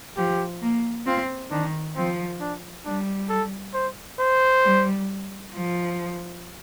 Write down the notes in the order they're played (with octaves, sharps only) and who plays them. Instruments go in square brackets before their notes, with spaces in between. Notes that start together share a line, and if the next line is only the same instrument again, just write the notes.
[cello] F3 [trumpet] G4
[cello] A#3
[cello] C4 [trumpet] F4
[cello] D#3 [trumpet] D4
[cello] F3 [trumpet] C4
[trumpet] D4
[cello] G3 [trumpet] D4
[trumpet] A4
C5
C5
[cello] G3
F3